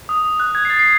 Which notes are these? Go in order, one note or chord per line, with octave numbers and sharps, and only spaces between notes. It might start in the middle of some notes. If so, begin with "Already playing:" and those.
D#6
F#6
G#6
C7
A6
C7